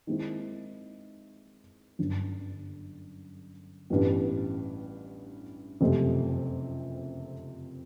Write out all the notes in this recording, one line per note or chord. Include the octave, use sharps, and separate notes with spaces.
D#3 G#3 C4 E4
G1 F#2 D3
A1 G2 E3 G3 B3
F#1 F2 C3 F3 A3